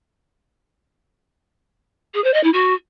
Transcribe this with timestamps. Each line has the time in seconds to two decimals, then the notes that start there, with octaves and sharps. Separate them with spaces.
2.14 G#4
2.24 C5
2.34 D#5
2.44 E4
2.53 F#4